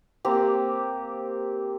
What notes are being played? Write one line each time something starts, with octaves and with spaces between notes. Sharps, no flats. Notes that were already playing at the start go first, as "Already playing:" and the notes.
A#3 C4 G4